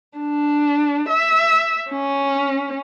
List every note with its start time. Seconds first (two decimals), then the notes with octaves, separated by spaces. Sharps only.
0.19 D4
1.09 E5
1.91 C#4